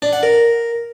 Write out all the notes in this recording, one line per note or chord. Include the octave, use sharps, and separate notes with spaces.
D4
F#5
A#4